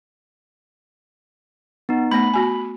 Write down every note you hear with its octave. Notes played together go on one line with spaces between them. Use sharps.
B3 D#4
A3 B3 B5
B3 F#4 G#5